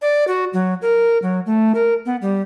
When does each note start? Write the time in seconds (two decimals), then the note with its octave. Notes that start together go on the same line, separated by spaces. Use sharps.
0.02 D5
0.28 F#4
0.53 F#3
0.82 A#4
1.22 F#3
1.46 A3
1.75 A#4
2.06 B3
2.22 G3